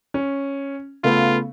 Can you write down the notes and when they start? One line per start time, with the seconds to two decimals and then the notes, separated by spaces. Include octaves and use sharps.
0.14 C#4
1.04 C#3 A3 B3 F4